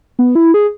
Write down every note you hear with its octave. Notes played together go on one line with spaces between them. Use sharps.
B3
E4
G#4